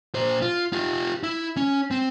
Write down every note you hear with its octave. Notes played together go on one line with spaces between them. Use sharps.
A#2 C5
F4
F4 G4
E4
C#4
C4